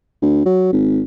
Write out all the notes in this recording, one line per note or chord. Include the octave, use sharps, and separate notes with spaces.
D2
F#3
G#1